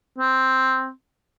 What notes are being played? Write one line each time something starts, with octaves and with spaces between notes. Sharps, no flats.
C4